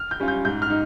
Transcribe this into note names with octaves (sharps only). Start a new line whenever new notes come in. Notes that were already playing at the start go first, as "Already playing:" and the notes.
Already playing: F6
G6
G3 C#4 F4
G6
G#2 G6
F6
D#4